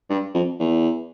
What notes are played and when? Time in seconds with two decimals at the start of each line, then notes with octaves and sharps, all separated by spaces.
0.10 G2
0.34 F2
0.59 E2